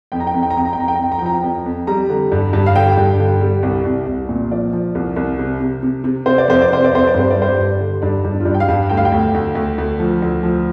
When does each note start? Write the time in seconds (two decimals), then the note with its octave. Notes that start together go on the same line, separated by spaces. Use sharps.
0.12 F2 G5
0.20 A#5
0.27 G5
0.34 F2 A#5
0.43 G5
0.50 A#5
0.56 F2 G5
0.65 A#5
0.73 G5
0.77 F2 A#5
0.88 G5
0.95 A#5
0.99 F2 G5
1.12 A#5
1.19 G5
1.22 F3 A#5
1.34 G5
1.43 F2
1.66 F2
1.87 G3 A#5
2.09 D3
2.32 G2
2.53 G2
2.66 F5
2.75 D3 G5
2.97 G2
3.19 D3
3.41 G3
3.63 C2
3.85 C2
4.07 C2
4.29 A#2
4.51 F3 D5
4.73 F3
4.95 C2
5.16 C2
5.39 C3
5.60 C3
5.83 C3
6.04 C3
6.26 C3 C5
6.38 D5
6.48 F2 C5
6.61 D5
6.71 C3 C5
6.84 D5
6.92 F2 C5
7.07 D5
7.14 G2 C5
7.30 D5
7.36 G3
7.42 C5
7.58 G2
7.80 D3
8.02 G2 D4
8.25 G2
8.32 D4
8.40 F4
8.45 G2 D4
8.54 G5
8.60 F5
8.68 G2
8.89 D2 G5
8.97 F5
9.05 G5
9.12 D2
9.34 D2
9.55 D2
9.78 D2
10.00 F3
10.22 D2
10.43 F3